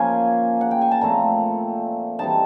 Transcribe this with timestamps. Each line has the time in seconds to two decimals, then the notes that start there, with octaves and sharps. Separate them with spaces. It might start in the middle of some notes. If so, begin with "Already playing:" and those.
Already playing: F3 A#3 C#4 G#5
0.61 F#5
0.71 G5
0.82 G#5
0.91 A5
1.01 A#2 F3 A3 C4 A#5
2.19 E3 G3 C4 D#4 A5